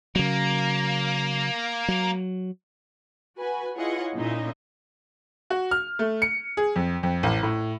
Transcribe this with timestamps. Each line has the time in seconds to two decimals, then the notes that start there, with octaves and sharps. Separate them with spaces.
0.16 C#3 F#3 A#3
1.88 F#3
3.40 F#4 B4 G#5
3.76 E4 F4 G#4 C#5 D#5 F#5
4.15 A#2 C#4 D#4 E4 D#5 E5
5.50 F#4
5.71 F6
5.99 A3
6.22 C#7
6.57 G#4
6.76 F2
7.03 F2
7.23 A1
7.43 A2